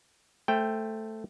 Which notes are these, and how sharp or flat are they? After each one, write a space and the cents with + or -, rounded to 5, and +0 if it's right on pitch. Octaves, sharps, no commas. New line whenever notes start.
A3 +0 C5 +0 G5 +0